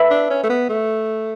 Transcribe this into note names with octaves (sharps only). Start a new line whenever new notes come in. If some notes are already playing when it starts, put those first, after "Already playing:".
Already playing: B4 E5 B5
D4
C#4
A3
B3
A3